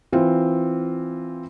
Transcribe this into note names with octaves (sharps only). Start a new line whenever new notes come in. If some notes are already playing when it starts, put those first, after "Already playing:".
E3 C4 F4